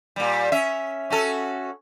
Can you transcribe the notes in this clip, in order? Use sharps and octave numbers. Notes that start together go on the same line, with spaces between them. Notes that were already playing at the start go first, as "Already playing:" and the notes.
A#2 G3
C#4 E5
C#4 F#4 A4